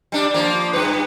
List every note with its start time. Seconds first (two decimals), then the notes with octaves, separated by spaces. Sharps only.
0.12 G3 D4
0.34 F3 A#3
0.73 G2 B4